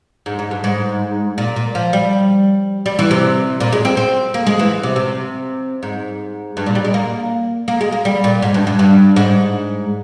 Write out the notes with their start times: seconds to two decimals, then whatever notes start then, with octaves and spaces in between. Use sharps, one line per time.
0.26 G#2
0.39 G#2
0.51 G2
0.64 G#2
1.38 A#2
1.56 A#2
1.75 F3
1.93 G3
2.86 G3
2.99 E3
3.11 C3
3.60 A#2
3.73 G#3
3.85 C4
3.97 C4
4.34 A#3
4.46 G#3
4.59 E3
4.83 C3
4.96 C3
5.83 G#2
6.57 G2
6.66 A#2
6.75 G3
6.85 G#3
6.94 A#3
7.68 A#3
7.81 G#3
7.92 A#3
8.05 G3
8.24 A#2
8.42 G#2
8.54 G2
8.67 G2
8.79 G2
9.16 G#2